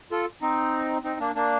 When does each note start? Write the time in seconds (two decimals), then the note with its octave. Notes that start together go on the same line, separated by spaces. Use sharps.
0.12 F4 A4
0.42 C4 D#4
1.04 C4 D#4
1.20 A#3 D4
1.35 A#3 D4